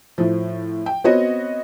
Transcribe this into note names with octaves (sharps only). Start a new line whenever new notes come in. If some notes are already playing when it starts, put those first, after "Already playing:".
A2 F3
G5
B3 C4 F#4 C#5 D#5